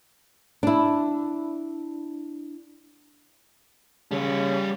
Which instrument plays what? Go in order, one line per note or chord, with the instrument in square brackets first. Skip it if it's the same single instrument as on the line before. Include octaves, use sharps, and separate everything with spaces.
[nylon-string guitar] D4 E4
[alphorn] C#3 [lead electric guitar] G3 C#5